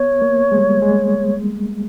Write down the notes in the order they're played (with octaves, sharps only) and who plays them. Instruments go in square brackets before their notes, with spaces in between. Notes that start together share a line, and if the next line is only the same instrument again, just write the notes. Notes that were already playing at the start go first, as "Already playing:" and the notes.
Already playing: [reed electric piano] B3 [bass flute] C#5
[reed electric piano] A#3
G#3
G3
G#3